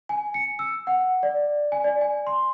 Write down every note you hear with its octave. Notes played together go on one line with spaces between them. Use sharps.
G#5
C#7
E6
F#5
D5
G#5
D5
G#5
C6